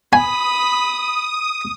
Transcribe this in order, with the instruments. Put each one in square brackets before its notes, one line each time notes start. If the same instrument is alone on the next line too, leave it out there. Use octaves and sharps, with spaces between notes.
[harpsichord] G#5 [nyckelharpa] B5 [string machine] D#6